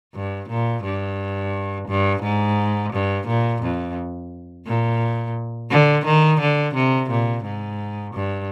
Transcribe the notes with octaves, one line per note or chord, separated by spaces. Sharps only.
G2
A#2
G2
G2
G#2
G2
A#2
F2
A#2
D3
D#3
D3
C3
A#2
G#2
G2